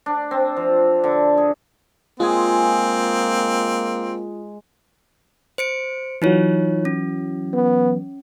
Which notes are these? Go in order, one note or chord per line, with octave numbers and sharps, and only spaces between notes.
D4
C4
F3
D3
G#4
G#3 A#3 C4 F4 G#4
C5 C#7 D7
E3 F#3 D#4 F4 C#5
C#4
B3